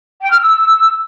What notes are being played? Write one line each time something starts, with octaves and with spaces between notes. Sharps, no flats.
G5
F6
E6